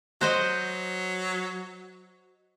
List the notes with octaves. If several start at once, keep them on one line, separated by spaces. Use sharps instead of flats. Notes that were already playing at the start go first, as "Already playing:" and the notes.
F#3 F#4 C5 D#5